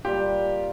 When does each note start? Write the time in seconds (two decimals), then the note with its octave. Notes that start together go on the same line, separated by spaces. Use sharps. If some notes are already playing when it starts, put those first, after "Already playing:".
0.04 G3 A#3 F4 G4